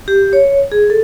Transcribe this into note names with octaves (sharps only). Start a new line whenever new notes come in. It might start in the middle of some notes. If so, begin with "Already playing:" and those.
G4
C#5
G#4
A4